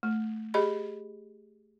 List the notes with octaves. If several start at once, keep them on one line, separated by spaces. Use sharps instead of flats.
A3
G4 G#4 D#5 B5